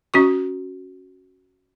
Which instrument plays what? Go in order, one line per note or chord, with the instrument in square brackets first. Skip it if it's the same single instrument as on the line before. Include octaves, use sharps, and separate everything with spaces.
[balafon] C#4 F#4 C#6